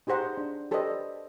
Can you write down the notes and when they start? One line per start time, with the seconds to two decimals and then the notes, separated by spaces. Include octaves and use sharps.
0.07 D#4 G4 G#4 C5 F#5 A#5
0.38 D4
0.71 G4 A4 B4 C5 D5 D#5